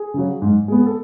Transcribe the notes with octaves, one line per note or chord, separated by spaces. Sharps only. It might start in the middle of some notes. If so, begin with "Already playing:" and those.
Already playing: G#4
C#3 F#3
G#2
G#3 B3
A4